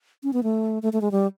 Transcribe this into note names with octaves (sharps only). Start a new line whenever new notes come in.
C#4
B3
A3
A3
A3
G#3
G3